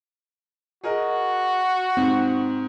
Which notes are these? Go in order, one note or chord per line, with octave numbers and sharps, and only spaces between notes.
F#4 G#4 A#4 D#5
G#2 C4